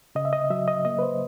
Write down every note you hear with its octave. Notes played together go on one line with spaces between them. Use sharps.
C#3 D#5
E5
D#5
F#3 E5
D#5
A#3 D#5
B4
C5